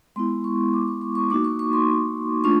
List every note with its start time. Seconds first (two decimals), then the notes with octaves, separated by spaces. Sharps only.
0.16 G#3 B3 E4 C6
0.44 C#6
0.74 D6
0.88 C#6
1.01 C#6
1.15 C#6
1.30 A#3 D#4 F#4 D6
1.45 C#6
1.59 C#6
1.73 C6
2.44 A3 D4 F4 C#6